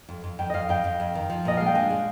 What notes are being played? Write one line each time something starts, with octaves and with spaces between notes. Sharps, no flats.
F2
F2
F2 G5
F2 D#5 F5
F2 G5
F2
F2
D#3
F3
A#2 D#5
G#3 F5
G5
D4 G#5
G#3